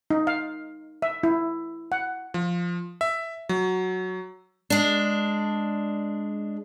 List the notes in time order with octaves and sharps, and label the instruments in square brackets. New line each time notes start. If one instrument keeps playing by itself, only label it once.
[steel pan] D#4
F5
E5
E4
F#5
[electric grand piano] F3
E5
F#3
[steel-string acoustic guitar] G#3 D4